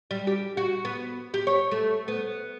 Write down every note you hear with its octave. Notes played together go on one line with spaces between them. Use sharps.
G3
G4
F#4
B3
G4
C#5
A3
B3